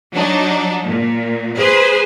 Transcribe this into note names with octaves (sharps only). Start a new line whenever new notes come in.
F#3 D4 D#4
A#2
G#4 B4 C5